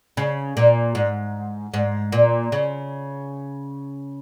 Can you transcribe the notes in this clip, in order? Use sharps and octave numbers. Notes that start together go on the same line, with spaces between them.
C#3
A#2
G#2
G#2
A#2
C#3